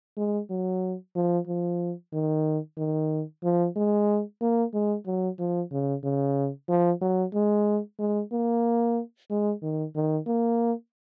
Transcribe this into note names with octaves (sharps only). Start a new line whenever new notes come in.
G#3
F#3
F3
F3
D#3
D#3
F3
G#3
A#3
G#3
F#3
F3
C#3
C#3
F3
F#3
G#3
G#3
A#3
G#3
D#3
D#3
A#3